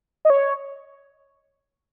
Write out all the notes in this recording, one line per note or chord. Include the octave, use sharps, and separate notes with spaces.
D#5
C#5